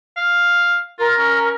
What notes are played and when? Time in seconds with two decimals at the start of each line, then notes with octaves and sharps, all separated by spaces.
0.17 F5
0.99 F4 A#4
1.18 C#4